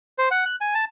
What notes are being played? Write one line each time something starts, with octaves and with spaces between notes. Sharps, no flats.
C5
F#5
F#6
G#5
A5